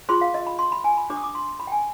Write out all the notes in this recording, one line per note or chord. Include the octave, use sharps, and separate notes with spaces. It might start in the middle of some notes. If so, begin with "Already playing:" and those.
F4 G#4 C5 C6
F5
D#5
B5
C6
B5
G#5
B5
D4 G4 C5 D6
D#6
D6
C6
B5
G5
G#5